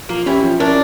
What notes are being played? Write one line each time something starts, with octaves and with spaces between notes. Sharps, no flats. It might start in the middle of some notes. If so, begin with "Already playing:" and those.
F3 A#3
C#4 E4 G4
F3
C#4 D4 E4 A#4